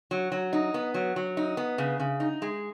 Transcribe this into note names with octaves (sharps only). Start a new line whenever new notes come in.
F#3
F#3
D#4
B3
F#3
F#3
D#4
B3
C#3
C#3
D#4
G#3